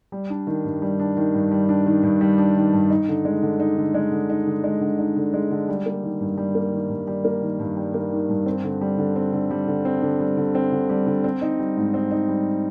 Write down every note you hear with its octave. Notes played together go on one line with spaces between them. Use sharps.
G3
D4
D#3
G2
G3
D4
D#3
G2
G3
D4
D#3
G2
G3
D4
D#3
G2
D#4
D3
G#3
D3
D#4
D3
G#3
D3
D#4
D3
G#3
D3
D#4
D3
G#3
D3
G3
A#3
D#3
G2
G3
A#3
D#3
G2
G3
A#3
D#3
G2
G3
A#3
D#3
G2
C4
D3
G3
D3
C4
D3
G3
D3
C4
D3
G3
D3
C4
D3
G3
D3
C4
D#4
G3
G#2
C4
D#4
G3